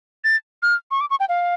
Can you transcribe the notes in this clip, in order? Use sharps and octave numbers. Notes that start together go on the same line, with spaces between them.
A6
F6
C#6
D6
C#6
G5
F5